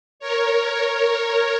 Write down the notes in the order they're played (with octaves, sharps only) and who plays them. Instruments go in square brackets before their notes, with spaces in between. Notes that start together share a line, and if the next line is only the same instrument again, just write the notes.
[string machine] A#4 C#5